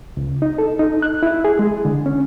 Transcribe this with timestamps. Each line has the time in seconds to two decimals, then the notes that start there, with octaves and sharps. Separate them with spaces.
0.17 C#2
0.42 D#4
0.58 A4
0.79 D#4
1.02 F#6
1.23 E4
1.45 G#4
1.59 G#3
1.85 D3
2.06 C#4